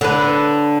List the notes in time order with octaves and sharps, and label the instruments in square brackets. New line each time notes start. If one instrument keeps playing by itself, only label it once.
[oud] D3 B4